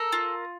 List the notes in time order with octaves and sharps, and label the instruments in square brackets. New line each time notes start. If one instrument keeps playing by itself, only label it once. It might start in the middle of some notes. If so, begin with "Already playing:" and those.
Already playing: [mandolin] A4 A#4
F4